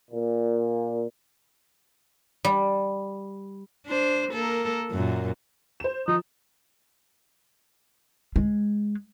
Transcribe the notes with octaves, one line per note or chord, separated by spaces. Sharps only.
A#2
G3
D4 C5
A#3 A4 A#4
F#2 A#2
C5 E7
F3 D#4
G#3